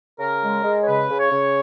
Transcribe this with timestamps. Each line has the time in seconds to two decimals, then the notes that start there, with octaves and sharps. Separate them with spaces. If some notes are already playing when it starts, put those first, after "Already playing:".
0.20 C#3 A#4
0.43 G#3
0.64 G#3
0.83 C#5
0.87 C#3 B4
1.09 C#3
1.20 C#5
1.31 C#3